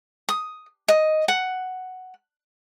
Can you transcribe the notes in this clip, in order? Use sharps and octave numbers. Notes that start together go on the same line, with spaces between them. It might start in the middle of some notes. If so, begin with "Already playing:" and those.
D#6
D#5
F#5